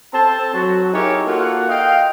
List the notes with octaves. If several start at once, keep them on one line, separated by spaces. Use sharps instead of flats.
C4 A4 C5 A5
F#3 F#4
D#4 E4 G4 G#4 A#4 C#5
A#3 F4 F#4 A4 F5 F#5
D#5 F5 G5